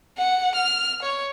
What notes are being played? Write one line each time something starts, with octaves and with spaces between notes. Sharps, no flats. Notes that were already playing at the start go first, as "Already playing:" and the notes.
F#5
F6
C#5